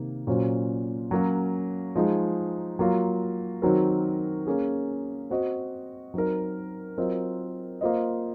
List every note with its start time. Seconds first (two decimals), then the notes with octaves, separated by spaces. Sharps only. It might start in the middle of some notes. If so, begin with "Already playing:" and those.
Already playing: C3 D#3 A#3
0.27 A#2 F#3 C#4 F#4 C5
1.11 F#3 A#3 C#4 F#4
1.96 F3 G#3 D#4 G#4
2.79 F#3 A#3 F4
3.62 D#3 F#3 C4 F#4 A#4
4.47 A#3 C#4 G#4
5.30 C4 F#4 C5 D#5
6.14 F#3 C4 D#4 A#4
6.97 F#3 C4 F4 A#4 D#5
7.81 A#3 F4 C5 D#5